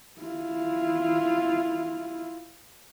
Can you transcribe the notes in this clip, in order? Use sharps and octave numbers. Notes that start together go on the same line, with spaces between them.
E4 F4